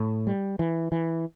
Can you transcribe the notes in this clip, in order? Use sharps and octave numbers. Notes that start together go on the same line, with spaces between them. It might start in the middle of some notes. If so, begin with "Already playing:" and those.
Already playing: A2
G3
E3
E3